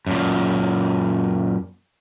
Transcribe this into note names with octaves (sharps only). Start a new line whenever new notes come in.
F#2 A#2